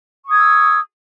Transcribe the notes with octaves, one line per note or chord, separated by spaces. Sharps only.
C#6 D#6 E6 G#6